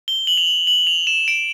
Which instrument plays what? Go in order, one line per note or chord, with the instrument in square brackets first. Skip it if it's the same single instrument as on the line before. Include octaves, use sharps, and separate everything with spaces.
[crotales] G7
F#7
F7
F#7
F#7
F7
E7
D7